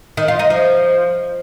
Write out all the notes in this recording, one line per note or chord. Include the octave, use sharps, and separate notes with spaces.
D#3
F4
D#4
F3